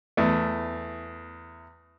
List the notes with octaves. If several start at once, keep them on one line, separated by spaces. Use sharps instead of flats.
E2 A3